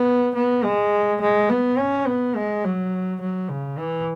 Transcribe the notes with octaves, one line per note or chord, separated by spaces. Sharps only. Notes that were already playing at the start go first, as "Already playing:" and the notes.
Already playing: B3
B3
G#3
G#3
B3
C#4
B3
G#3
F#3
F#3
C#3
E3